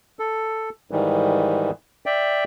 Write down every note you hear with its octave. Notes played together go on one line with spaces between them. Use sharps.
A4
G#2 D#3 E3 G3
D5 E5 G5